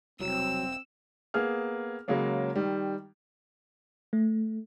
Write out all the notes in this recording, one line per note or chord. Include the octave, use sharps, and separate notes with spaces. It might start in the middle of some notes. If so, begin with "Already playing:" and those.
E1 C2 F#3 C4 E6
A#3 B3 G#4 F6
C#3 F#3 G#3 A#3 C#4
D#3 G3
A3